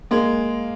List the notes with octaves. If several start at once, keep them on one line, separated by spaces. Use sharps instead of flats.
G#3 A#3